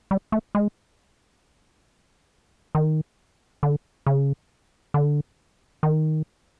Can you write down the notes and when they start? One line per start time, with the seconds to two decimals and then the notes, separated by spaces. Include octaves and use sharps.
0.11 G3
0.32 A3
0.55 G#3
2.75 D#3
3.63 D3
4.07 C#3
4.94 D3
5.83 D#3